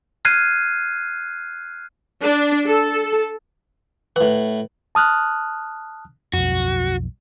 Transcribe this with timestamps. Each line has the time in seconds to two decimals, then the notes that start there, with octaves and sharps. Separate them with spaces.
0.25 F6 F#6 G#6 C7 D#7
2.22 D4
2.67 A4
4.16 A2 B4 F#5
4.95 A5 D#6 F6 F#6
6.33 B1 F2 F#4